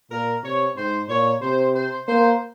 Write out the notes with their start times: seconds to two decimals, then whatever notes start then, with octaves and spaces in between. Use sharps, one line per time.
0.11 A#2 A#4
0.43 C3 C#5
0.76 G#2 C5
1.09 A#2 C#5
1.41 C3 C5
1.75 C5
2.08 A#3 C5